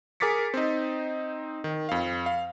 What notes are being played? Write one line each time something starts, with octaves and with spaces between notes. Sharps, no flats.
G#4 A#4 D6 A6 B6 C#7
C4 D#4
D#3
F2 F5
F5